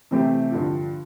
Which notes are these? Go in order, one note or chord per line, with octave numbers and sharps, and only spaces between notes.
C3 E3 A3 C4 G4
G2 D3 F3